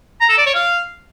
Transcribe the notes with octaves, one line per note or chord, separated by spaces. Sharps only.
A#5
A4
D5
C#5
F5